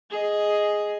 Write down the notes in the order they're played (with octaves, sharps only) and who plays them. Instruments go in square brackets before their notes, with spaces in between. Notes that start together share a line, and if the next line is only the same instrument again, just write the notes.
[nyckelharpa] G#4 D#5